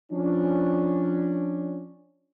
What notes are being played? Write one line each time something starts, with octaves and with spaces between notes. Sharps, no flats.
F3 C#4 D4